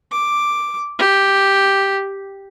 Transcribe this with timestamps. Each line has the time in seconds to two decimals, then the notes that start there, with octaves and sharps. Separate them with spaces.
0.12 D6
0.99 G4